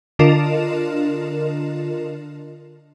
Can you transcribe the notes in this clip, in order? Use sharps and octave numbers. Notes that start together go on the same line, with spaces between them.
D3 D4 F4 A#4 D#5 E7